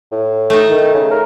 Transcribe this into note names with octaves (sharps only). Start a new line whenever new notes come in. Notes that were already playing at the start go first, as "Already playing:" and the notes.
A2
A3 D#4
D#3
C#3
A#4